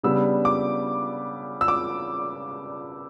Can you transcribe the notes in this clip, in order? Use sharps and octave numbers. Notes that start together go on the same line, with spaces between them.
C#3 G3 B3 D4 E6
D6
E6
D6